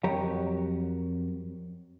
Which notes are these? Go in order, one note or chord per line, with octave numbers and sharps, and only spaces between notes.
F2 F#3 G4 A#4 C#5 A#5